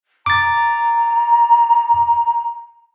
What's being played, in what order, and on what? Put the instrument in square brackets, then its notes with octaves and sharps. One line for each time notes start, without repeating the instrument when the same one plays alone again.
[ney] A#5 [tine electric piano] D6 A6